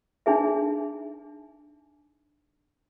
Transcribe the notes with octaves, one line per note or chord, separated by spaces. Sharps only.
D4 D#4 G#4 E5